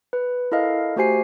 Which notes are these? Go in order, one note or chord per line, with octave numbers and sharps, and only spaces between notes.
B4
E4 A4 A#4 D#5 F5
A3 F#4 G4 C5 G#5 C7